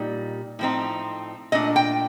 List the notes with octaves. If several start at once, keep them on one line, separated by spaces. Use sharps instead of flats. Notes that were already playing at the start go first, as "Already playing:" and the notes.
Already playing: A#2 G3 D#4
A2 F3 C4 D#4
A#2 A3 D4 D#5
G5